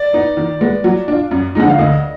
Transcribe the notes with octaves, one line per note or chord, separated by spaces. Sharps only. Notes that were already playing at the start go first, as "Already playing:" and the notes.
Already playing: D5
B3 D#4
D#3
G#3 B3
F#3
D4 F4
F#2
D3 F3 G#3 D#4 F#5
F5
D2 D#5